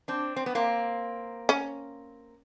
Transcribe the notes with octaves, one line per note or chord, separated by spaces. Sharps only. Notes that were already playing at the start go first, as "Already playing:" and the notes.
C4 D4
C4
B3
A#3 C4
C#4